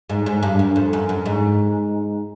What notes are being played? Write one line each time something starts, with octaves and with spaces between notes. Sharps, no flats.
G#2
G#2
G2
F#2
F2
F#2
F#2
G#2